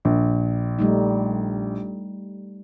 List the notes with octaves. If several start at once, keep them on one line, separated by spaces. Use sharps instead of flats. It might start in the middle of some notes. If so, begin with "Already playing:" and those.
A#1
G3 A3 D#4